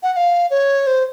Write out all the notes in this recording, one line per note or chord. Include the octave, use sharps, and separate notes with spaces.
F#5
F#5
F5
C#5
C5